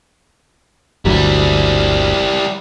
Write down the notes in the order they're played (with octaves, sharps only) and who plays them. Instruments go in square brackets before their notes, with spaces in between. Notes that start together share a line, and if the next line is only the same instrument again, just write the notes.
[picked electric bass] G1 D2 F#3 [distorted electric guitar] G3 E4